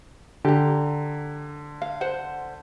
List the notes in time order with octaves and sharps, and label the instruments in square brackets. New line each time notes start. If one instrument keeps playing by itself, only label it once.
[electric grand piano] D3 [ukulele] G4 A#5
[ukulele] F5
C5 F#5